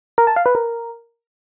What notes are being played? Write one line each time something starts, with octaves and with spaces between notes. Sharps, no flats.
A#4
A5
F5
B4
A#4